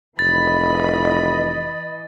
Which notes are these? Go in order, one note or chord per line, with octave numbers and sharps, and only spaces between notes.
F1 E3 D#5 B5 A6